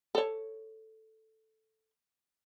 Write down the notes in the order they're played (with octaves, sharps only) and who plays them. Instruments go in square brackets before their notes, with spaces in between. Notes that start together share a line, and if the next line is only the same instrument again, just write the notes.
[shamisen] A4 C#5